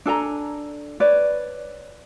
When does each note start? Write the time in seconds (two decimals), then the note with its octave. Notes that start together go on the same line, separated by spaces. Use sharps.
0.06 D4 A4 G#5 A#5
1.00 B4 C#5 D5